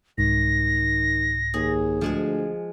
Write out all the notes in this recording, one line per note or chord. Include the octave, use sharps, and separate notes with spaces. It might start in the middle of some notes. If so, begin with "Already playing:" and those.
C2 G#2 D#3 A#6
D#2 G#4
D2 F3 G#3 G#5